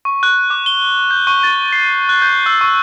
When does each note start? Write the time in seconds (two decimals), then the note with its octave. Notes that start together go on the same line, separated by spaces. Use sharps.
0.05 C#6
0.23 F#6
0.50 D6
0.66 G7
1.11 G6
1.27 C#6
1.43 A6
1.72 C7
2.09 F#6
2.22 G6
2.46 E6
2.61 C#6